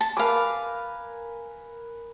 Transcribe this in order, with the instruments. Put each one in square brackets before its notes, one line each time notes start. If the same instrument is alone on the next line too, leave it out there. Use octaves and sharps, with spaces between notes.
[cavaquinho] A5
[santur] A#4 B4 G#5 [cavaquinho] F5 D6